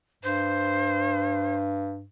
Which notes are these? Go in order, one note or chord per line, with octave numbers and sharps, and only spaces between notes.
G2 C5